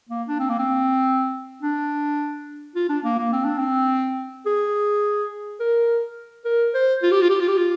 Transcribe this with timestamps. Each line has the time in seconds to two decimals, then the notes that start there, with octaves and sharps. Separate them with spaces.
0.09 A#3
0.28 D4
0.39 C4
0.49 A#3
0.59 C4
1.62 D4
2.75 F4
2.89 D4
3.04 A#3
3.19 A#3
3.33 C4
3.45 D4
3.59 C4
4.46 G#4
5.60 A#4
6.45 A#4
6.74 C5
7.03 F4
7.11 G4
7.21 F4
7.30 G4
7.40 F4
7.48 G4
7.57 F4